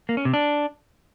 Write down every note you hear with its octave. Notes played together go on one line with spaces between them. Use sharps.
A#3
C#4
C3
D4